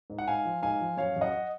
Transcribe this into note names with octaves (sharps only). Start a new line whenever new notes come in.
G#2
F#5
G#2 F5 G#5
F3
G#2 F5 G#5
F3
F#2 C#5 F5
F#2
D#5 F#5